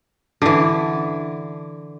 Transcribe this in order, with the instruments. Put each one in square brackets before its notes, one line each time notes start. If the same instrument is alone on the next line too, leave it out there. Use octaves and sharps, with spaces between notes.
[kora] D3 E3